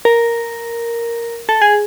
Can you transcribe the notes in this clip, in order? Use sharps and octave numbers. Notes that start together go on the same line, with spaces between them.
A#4
A4
G#4